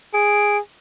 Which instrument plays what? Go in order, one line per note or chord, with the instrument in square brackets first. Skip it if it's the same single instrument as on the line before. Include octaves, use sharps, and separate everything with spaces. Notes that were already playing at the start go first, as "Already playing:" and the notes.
[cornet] G#4 [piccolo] D7